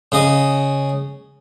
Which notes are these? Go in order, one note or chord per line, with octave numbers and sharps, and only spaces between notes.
C#3 D#5